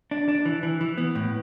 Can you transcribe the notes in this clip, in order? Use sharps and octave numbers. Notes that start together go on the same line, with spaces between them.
D4
D4
E3
E3
E3
B3
A2